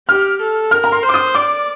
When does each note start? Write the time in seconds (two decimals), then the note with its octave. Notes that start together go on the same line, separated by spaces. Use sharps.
0.08 G4 F6
0.41 A4
0.71 A#4 F6
0.84 A#5
0.92 C6
1.03 C5
1.09 D6
1.14 D#6
1.35 D5 D6